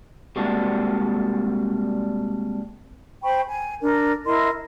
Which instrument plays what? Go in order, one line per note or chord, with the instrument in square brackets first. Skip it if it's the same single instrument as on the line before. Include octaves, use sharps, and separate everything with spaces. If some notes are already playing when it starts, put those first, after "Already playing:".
[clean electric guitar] C3 G3 G#3 A#3 D4 F#4
[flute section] C5 G5 B5 C#6
G#5
D4 A#4
E4 A#4 D#5 C6